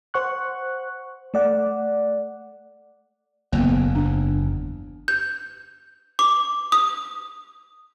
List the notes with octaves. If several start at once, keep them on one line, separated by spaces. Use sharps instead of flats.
C5 F#5 C#6 F#6
A3 D5 F#5
F#1 E2 A#3 B3
D4
G6
D6
D#6